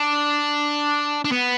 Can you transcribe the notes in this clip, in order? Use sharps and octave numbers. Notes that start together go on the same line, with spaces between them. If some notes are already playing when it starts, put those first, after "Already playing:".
Already playing: D4
D4
B3